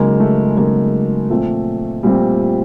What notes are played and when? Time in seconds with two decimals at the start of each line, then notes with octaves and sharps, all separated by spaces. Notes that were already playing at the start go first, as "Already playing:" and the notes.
Already playing: C#3 F#3 G#3 A#3 D#4
0.20 A3
0.57 C#3 F#3 G#3 A#3 D#4
1.30 A#2 F3 A3 C4
2.03 A#2 F3 G3 A3 C4